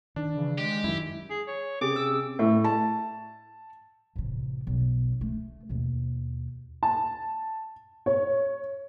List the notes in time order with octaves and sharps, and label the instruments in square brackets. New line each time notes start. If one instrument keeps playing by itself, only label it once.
[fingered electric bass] D#3 [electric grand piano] D4
[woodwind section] C#3 E3
[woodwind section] G#3 [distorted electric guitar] G4
[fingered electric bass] F#2 D#3 [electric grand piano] E4
[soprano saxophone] G#4
C#5
[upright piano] C3 [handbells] C#4 G4 G#4 [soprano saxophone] D6
[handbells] E6
[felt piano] A2
A5
[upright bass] A1 C3
B1
A3
D#2 B2
[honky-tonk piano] A5
C#5